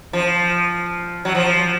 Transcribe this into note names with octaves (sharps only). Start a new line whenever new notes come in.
F3
F#3
F3